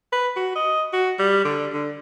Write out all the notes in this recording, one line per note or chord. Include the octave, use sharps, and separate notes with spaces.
B4
F#4
D#5
F#4
G3
D3
D3